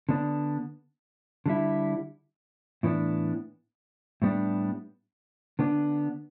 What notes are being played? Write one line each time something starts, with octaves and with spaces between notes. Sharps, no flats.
D3 B3 D4
D3 G3 E4
A2 E3 B3 D4
A2 G3 B3 D4
D3 B3 D4